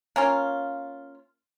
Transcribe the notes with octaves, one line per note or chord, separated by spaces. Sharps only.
A#3 C#4 F4